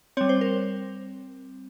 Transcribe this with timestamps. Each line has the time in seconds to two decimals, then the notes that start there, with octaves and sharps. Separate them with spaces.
0.17 G3 C4 C#5
0.29 C5
0.41 A#4